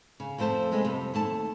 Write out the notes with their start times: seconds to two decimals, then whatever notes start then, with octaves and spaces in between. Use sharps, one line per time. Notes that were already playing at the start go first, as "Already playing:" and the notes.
0.20 C#3
0.38 F2 F3 A3 C5 A5
0.72 C3 G#3 A3 B3
0.84 F2 C3 G3
1.14 D#2 A3 A5